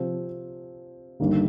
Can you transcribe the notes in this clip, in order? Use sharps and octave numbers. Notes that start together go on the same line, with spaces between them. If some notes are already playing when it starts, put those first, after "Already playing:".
Already playing: C3 F3 C4
G1 G2 D#3 G3 A#3